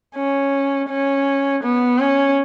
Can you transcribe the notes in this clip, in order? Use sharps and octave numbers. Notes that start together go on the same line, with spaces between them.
C#4
C#4
B3
C#4